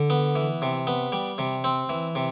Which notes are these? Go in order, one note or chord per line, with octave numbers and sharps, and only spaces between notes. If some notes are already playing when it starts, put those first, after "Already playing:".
Already playing: D3
B3
E3
C3
B3
G3
C3
C4
E3
C3